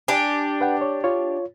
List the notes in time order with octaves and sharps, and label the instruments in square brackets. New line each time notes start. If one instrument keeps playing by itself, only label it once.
[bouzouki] D4 G4 [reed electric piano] G#5
[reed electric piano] B4 F#5 G5
C#5
F4 C#5